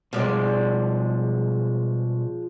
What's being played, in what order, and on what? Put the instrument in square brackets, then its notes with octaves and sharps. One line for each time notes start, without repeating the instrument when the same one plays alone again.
[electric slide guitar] B2 G3 [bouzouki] F3 G#3 D5